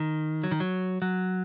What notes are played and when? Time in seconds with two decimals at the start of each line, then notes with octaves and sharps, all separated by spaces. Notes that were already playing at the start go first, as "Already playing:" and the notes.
Already playing: D#3
0.44 F#3
0.51 D#3
0.60 F#3
1.02 F#3